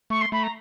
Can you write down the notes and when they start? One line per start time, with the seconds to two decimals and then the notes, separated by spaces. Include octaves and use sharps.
0.10 A3 C#6
0.21 C6
0.32 A3 B5
0.43 A#5